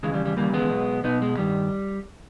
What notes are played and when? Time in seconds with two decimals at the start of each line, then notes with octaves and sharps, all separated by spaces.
0.03 D#2 C#3 E3 G#3
0.14 G3
0.25 G3
0.36 D#2 C#3 E3 G3 A#3
0.54 G#3 B3
0.70 B1 B2
1.04 B1 B2 B3 D#4
1.22 G#3
1.38 G2 D#3 G3